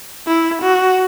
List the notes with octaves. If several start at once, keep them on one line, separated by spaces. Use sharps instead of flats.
E4
F#4